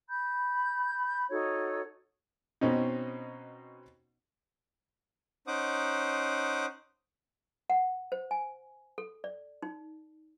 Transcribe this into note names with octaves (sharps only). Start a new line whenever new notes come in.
B5 G6
D#4 F#4 A4 C#5
B2 C4 C#4 D#4
C#4 D#4 C5 F#5 D6 D#6
F#5
C5
G#5
A4
D5
D#4